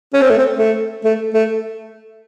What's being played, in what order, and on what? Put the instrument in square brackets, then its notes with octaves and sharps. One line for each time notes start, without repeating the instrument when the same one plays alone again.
[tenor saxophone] C#4
C4
A3
C4
A3
A3
A3